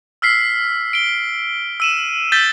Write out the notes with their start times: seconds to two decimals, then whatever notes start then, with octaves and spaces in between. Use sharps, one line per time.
0.22 E6 F6 B6 C7
0.93 D7 G7
1.80 E6 D#7 E7
2.32 E6 G6 A6 B6 D#7 G7